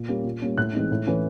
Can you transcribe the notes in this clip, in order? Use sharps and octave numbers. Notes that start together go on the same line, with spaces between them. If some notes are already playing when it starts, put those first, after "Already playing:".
Already playing: A#2
G3 A#3 C#4
A#2
G3 A#3 C#4
A2 F#6
E3 G#3 C4 D#4
A2
E3 A3 C#4